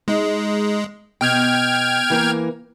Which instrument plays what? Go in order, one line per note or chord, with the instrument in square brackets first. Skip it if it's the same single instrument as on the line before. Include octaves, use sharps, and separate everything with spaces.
[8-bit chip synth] G#3 [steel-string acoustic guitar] D#4
[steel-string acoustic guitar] B2 [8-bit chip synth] G5 F6 G#6
[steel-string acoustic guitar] E3 A#3 A#4